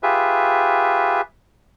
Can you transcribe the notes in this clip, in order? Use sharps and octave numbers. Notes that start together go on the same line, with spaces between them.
F4 G4 G#4 B4 E5